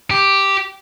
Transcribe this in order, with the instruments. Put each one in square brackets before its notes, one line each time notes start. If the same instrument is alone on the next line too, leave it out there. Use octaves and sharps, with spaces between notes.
[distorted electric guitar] G4